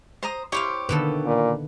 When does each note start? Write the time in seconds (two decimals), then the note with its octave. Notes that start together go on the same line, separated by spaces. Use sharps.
0.23 C5 A#5 D#6
0.52 E4 G4 C5 C#5 F5
0.89 B2 D3 D#3 A#3 A4 B4
1.26 A#2